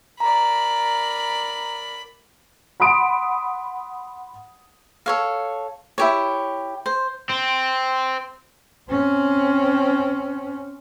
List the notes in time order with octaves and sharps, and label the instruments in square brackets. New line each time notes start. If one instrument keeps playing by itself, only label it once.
[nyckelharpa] A#4 D5 [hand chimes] A#5 [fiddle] B5
[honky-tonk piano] F#5 B5 C6 D#6 D7
[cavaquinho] A4 C#5 F5
E4 G4 C#5
C5
[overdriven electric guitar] C4
[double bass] C4 C#4